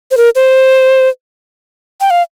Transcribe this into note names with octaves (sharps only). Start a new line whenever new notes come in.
C5
A#4
C5
G5
F5